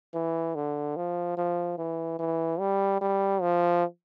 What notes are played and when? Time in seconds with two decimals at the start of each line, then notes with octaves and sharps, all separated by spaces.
0.14 E3
0.55 D3
0.96 F3
1.38 F3
1.78 E3
2.19 E3
2.60 G3
3.01 G3
3.41 F3